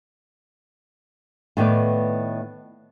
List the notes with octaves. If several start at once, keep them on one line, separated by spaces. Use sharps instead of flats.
A2 D#3 B3 B4 D5